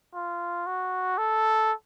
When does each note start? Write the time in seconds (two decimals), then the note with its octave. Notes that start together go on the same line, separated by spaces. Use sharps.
0.14 F4
0.67 F#4
1.18 A4